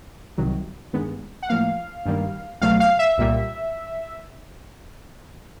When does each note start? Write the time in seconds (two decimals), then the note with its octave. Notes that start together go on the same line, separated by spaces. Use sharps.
0.38 C2 C3 D#3 F#3
0.93 G2 D#3 G#3 B3
1.43 F#5
1.49 A2 F3 A#3 F5
2.05 G2 D#3 G3 A#3
2.61 C#2 B2 F#3 A3 F5
2.80 F5
2.99 E5
3.18 C2 A#2 G3 A#3